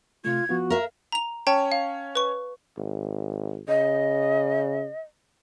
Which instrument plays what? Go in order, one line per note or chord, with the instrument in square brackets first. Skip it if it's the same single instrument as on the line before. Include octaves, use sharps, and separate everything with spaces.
[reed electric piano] C3 A3 [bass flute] F4 [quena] G#6
[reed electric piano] F3 B3 F4 [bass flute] F#4
[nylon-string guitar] A#4 E5 [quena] F5
[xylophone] A#5 F7
[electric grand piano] C#4 C#5 [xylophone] G5 A5
[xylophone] F5
B4 C#6
[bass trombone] G#1
[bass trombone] C#3 [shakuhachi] D#5